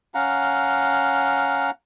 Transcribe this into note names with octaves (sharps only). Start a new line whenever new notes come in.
C#4 F5 F#5 A#5